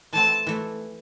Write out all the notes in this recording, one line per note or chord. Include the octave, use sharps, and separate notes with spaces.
E3 A3 C4 A5
E3 A3